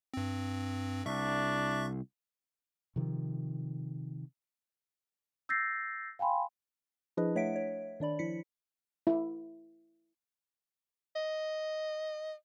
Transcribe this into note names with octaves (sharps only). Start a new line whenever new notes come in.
G2 C4
C2 D4 E5 C#6
C3 D#3 F3
E6 G6 A6 A#6 C7
F5 G5 G#5 B5 C6
F3 D4 E4 G#4 B4 D#5
A3 C#5 E5 F#5 B6 D7
C#5
D#3 D4 D5 B5
F3 E4 B6 C#7
E4
D#5